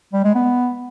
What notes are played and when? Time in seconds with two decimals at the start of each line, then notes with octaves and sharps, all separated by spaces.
0.13 G3
0.24 G#3
0.35 B3